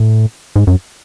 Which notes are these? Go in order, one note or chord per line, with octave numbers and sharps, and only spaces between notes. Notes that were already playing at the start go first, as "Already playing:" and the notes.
Already playing: A2
G#2
F#2